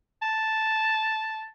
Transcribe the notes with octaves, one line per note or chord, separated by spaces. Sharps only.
A5